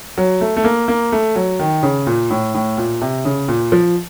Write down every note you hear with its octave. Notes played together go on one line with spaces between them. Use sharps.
F#3
A3
A3
A#3
A#3
A3
F#3
D#3
C#3
A#2
A2
A2
A#2
C3
C#3
A#2
F3